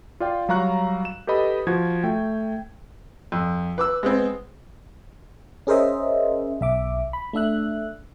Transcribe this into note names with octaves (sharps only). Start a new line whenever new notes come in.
F4 D5 F5 G5
F#3 G3 F5 A#5 C#6 F#6
E7
G4 A4 B4 D#5 B5
F3 F#4 G#6
A3 G5
F2
B4 D6 E6
G#3 B3 C4
C#4 G#4 A#4 C5 D#5 E5
B1 E5 D6
B5
A3 D4 E5 F#6